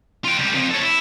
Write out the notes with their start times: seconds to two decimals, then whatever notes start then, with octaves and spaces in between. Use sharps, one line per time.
0.25 F4 G5
0.38 C#2 G3
0.54 F3 C4
0.71 A4 C#5
0.83 E4